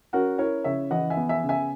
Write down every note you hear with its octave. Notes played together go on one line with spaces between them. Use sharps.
C#4 F#4 A#4
E4 A#4 C#5
C#3 C#5 E5
E3 D#5 F#5
E5 G#5
B3
E5 G#5
C#3
E5 G#5